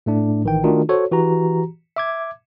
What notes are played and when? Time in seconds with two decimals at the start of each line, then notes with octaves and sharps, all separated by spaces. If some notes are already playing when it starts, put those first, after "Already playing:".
0.06 A2 A3 D4
0.44 A1 D#3 E3 G5
0.64 D#3 A3 D4 D#4 F4 F#4
0.89 F#4 A4 C5 C#5
1.11 E3 F#4 G4 A#5
1.96 E5 D6 G#6